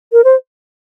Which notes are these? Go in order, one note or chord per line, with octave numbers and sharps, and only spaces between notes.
A#4
C5